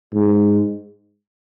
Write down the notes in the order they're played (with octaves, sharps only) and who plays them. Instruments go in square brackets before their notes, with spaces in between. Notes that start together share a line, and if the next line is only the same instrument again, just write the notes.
[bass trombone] G#2